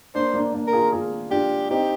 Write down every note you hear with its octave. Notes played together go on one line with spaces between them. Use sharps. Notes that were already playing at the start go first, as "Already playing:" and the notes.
A#3 D4 C5
A#3 D4
A#3 D4
A#4
F4 G#4
F4 G#4
D4 F4 G4
C4 D#4 G4